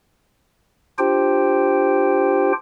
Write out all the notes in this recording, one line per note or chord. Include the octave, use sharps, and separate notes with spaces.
D4 F4 G4 C5 G5